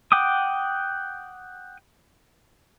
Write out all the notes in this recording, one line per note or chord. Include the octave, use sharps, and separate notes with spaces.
F#5 G5 D6 D#6